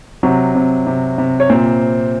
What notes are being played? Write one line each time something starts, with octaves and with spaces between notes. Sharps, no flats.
C3 F#3 F#4
C3
C3
C3
C#5
A#2 C4 C5